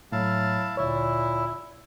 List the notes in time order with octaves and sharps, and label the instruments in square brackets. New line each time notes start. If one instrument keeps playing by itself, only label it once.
[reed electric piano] A2 [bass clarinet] F#3 [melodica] E4 F5 A5
[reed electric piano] D2 C#5 [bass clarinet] A#2 [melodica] E4